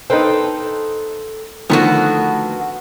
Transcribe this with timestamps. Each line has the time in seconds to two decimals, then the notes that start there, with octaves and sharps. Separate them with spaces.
0.10 D#4 A4 B4 C5 F5 G5
1.70 D3 D#3 F3 A3 B3 D#4 F#4